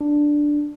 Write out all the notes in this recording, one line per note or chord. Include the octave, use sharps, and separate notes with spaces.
D4